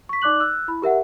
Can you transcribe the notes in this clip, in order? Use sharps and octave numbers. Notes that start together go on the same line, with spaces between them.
C#6 B6
D#4 D5 D6 F#6 F#7
E6 F#6
E4 B5
G4 A#4 E5 F#5